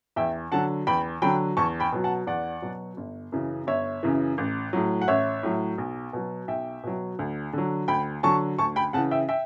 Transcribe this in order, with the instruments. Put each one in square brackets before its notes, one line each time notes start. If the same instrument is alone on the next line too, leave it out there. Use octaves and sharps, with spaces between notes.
[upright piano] E2 E5 G5
D3 F#3 F#5 A5
E2 G5 B5
D3 F#3 G5 B5
E2 A5 C#6
G5 B5
B2 F#3
F#5 A5
E2 D5 F#5
B2 F#3
G1
F#2 C#3 E3
G1 C#5 E5
F#2 C#3 E3
A1
A2 F#3
F#5
A1 C#5 E5
A2 F#3
B1
B2 F#3
B1 E5 G5
B2 F#3
D2
D3 F#3
D2 G5 B5
D3 F#3 A5 C#6
D2 A5 C#6
G5 B5
C#3 F#5 A5
E3
E5 G5
E5 G5